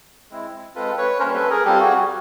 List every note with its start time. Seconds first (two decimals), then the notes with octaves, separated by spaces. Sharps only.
0.31 G#3 C4 E4
0.75 G#3 C4 F4 A4 B4
0.97 B4 C#5
1.20 G3 A#3 C#4 A#4 C5
1.35 A4 B4
1.50 G#4 A#4
1.65 G3 C4 F4 G4 A4
1.80 F#4 G#4